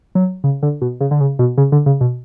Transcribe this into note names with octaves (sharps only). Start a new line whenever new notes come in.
F#3
C#3
D3
B2
C#3
D3
C#3
B2
C#3
D3
C#3
B2